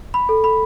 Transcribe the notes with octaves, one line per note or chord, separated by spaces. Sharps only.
B5
A4
B5